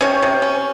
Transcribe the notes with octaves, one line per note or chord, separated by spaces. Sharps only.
C3 C#4 C#5
C3
C#4